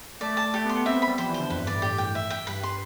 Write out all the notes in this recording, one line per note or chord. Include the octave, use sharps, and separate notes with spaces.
A3 D5
A5
A3 G4
B3
C6
B3
C4 E5
B3
B5
G3
F3 C5
E3
C5
D3
F2 B4
G2
E3 D5
A2
G4
G5
E5
G5
G2 B4
C6